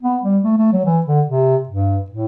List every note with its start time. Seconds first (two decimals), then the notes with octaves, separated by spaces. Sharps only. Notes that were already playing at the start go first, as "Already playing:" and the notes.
0.02 B3
0.23 G3
0.44 A3
0.58 A3
0.72 F#3
0.85 E3
1.06 D3
1.27 C3
1.69 G2
2.11 A2